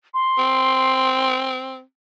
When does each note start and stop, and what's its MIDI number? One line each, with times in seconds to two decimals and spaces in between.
0.14 1.37 84
0.38 1.81 60